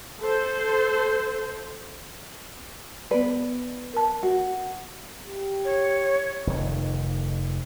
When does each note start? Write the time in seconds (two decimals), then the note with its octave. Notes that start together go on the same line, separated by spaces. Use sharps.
0.19 A4 C5
3.11 B3 B4 D5
3.94 A#4 A5
4.23 F#4
5.27 G4
5.65 C#5
6.47 F1 F2 D#3